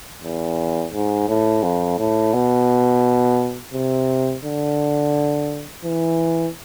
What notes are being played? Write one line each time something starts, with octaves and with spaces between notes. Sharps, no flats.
E2
G#2
A2
F2
A2
B2
C3
D3
E3